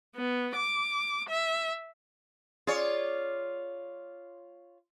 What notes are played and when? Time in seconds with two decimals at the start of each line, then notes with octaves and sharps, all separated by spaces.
0.16 B3
0.56 D6
1.29 E5
2.67 F4 G#4 C#5 D5